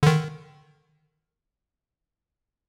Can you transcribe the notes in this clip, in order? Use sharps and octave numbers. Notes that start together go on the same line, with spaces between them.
D3 D#3